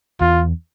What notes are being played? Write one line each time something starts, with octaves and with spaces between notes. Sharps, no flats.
E2 F4